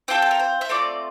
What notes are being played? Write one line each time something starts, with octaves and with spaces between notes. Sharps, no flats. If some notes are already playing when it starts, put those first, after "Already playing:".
C4 F4 A4 G5
A4
A#4
C5
E5
A3 C4 F4 D5